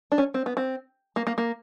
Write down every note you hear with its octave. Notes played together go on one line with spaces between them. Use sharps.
D4
C#4
C4
B3
C4
A#3
A#3
A#3